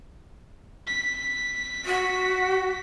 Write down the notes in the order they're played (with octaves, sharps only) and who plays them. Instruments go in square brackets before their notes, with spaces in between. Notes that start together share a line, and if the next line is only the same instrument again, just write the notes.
[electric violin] B6
[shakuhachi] F#4